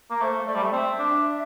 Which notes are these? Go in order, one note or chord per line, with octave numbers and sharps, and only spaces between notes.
A#3
A3 C5
A3 D5
G3
A3
C4 E5
D4